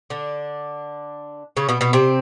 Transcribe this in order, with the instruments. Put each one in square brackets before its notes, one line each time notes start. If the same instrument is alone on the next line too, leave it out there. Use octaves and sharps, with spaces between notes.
[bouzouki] D3 D4
C#3 C#4
B2 B3
B2 B3
C3 C4